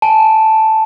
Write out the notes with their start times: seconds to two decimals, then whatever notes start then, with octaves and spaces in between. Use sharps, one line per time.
0.02 G#5 A5